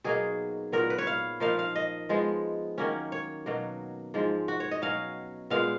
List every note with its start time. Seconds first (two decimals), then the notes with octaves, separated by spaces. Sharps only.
0.04 B2 F#3 A#3 D#4 G#4
0.72 A#2 F#3 B3 A#4
0.90 B4
0.98 C#5
1.07 F5
1.40 F3 A#3 D#4 F5
1.59 F5
1.75 D#5
2.09 F3 G#3 B3
2.78 D#3 F#3 A#3 C#4
3.12 C#5
3.46 B2 F#3 A#3
4.14 G#2 F3 G#3
4.48 F#4
4.60 C#5
4.71 D#5
4.82 B2 F#3 C#4 F5
5.50 A#2 G#3 B3 F5